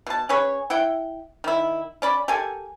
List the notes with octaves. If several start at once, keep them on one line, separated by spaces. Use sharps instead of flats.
B2 A5
C#4 G#4 B4 C#5
E4 F#5 G5
D#3 E4
C#4 D5 B5
G4 A4 A#4 G#5